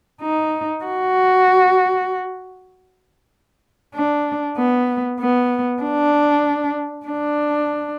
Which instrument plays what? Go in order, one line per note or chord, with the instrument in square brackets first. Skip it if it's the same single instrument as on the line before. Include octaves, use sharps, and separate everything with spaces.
[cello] D#4
F#4
D4
B3
B3
D4
D4